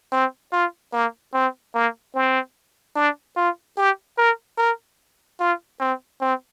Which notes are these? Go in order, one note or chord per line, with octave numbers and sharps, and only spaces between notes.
C4
F4
A#3
C4
A#3
C4
D4
F4
G4
A#4
A#4
F4
C4
C4